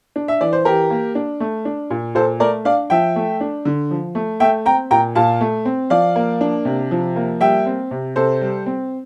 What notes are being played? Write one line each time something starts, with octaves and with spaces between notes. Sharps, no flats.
D4
E5
E3 D5
C5
E3 G4 A#4
A#3
D4
A3
D4
A#2
A#2 A4 C5
A3 A#4 D5
D4 D5 F5
F3 E5 G5
A3
D4
D3
F3
A3
A3 E5 G5
C4 G5 A#5
A#2 G5 A#5
A#2 F5 A5
A3
C4
F3 D5 F5
A#3
D4
C3
F3
A#3
G3 E5 G5
C4
C3
C3 A4 C5
G3
C4